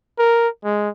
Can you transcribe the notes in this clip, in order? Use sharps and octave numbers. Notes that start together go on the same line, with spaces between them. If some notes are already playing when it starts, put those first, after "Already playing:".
A#4
G#3